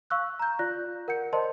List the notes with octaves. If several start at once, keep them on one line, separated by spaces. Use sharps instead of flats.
F5 C#6 E6 F#6
A#5 G6
F4 D5 F#6 A#6
A#4 F#5 G6 C#7
A#4 C5 D5 D#5 A5 C6